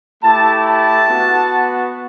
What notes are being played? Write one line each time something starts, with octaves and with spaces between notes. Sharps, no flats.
A3 E4 G4 A5
A5
B3 F#4